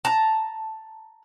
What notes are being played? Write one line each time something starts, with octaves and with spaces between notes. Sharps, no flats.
A5 A#5